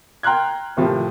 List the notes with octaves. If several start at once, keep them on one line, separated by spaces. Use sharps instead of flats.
G5 A#5 C6 F6 F#6 G#6
D#2 A2 C3 F3